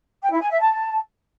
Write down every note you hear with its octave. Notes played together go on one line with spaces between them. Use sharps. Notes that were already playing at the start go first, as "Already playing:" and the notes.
G5
E4
G#5
E5
A5